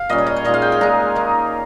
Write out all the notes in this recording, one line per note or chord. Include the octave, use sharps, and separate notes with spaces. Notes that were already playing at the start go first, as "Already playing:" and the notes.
Already playing: F5
A#2 G3 C#4 D#5
C#5
D#5
C#5
A#2 G#3 D#4 D#5
F5
G5
G#5
A#2 G#3 D#4 A#5
D#3 A#3 D#4